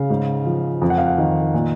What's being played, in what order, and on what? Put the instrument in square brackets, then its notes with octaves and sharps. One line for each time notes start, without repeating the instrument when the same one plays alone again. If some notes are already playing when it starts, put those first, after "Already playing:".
Already playing: [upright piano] C#3 F5
G#2
F3
F2
F#5
F5
F#5
D#3
A#2